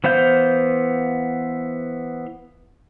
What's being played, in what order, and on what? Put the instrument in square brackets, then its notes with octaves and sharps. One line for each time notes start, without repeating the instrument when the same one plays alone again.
[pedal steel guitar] E3 B3 C5 F5 G6